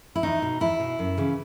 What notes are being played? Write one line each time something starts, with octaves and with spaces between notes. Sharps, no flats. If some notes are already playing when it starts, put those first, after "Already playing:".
E4
E2 D#4
B2
E2 E4
B2
F#2
C#3 E3